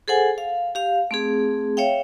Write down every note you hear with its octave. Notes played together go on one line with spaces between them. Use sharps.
G#4 A4 C5 F#5 G#5
F5
G4 F5
A3 C4 G#4
C#5 E5 F5 G5